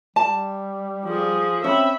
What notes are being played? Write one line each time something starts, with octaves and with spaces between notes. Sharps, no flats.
G3 A5
F3 G#4
C4 C#4 E5 B5